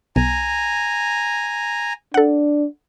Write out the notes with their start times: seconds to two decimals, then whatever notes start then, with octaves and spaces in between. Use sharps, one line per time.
0.16 B1 G#5 A#5
2.14 D4 A4 F#5